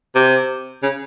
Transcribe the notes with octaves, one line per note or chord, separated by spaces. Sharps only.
C3
C#3